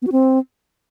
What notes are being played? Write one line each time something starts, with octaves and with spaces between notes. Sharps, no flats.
B3
F#4
C4